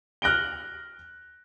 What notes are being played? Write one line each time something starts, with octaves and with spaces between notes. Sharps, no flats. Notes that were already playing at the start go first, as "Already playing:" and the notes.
F6 F#6 A#6 D7 G7